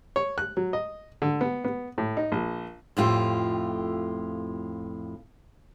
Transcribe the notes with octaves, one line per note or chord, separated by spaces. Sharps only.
C#5
F#6
F#3
D#5
D3
B3
B3
A2
D#4
A#1
F2 A2 F4 G4